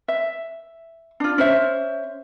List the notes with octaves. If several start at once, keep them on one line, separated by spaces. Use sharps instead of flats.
E5
D4 F4
C#4 C5 E5